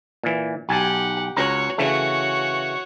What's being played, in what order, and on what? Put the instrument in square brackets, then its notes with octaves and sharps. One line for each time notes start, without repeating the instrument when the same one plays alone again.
[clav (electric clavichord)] A#2 E3
[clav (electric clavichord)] B1 G#5 A5 [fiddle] G4 F#5
[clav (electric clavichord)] C#2 A#5 [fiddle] F#4 C#5
[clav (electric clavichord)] C#3 E3 A3 [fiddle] F#4 C#5